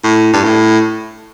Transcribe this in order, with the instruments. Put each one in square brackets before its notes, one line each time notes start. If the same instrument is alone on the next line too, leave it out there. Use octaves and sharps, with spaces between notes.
[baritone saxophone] A2
G2
A2